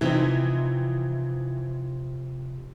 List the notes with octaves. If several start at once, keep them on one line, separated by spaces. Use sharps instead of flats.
C3 E3 F3 C4 D#4